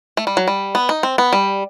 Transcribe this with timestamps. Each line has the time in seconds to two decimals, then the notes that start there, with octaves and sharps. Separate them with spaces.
0.17 A3
0.27 G3
0.37 F#3
0.48 G3
0.75 B3
0.89 D#4
1.03 C4
1.18 B3
1.33 G3